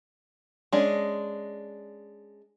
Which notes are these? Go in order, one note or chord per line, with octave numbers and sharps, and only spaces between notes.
G#3 C#4 D4